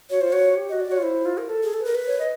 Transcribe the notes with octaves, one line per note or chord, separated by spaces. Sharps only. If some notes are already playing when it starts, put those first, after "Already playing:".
F#4 C#5
F4 C5
F#4 C#5
G4
F#4 D#5
D5
F#4 C#5
F4
E4 C5
F4
A#4
A4
G#4
A4
A#4 B4
B4
C#5
D#5